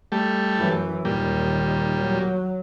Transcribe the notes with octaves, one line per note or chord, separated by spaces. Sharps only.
G3 A3
F#2 E3
D#2 A#2 D#3 G3
F#3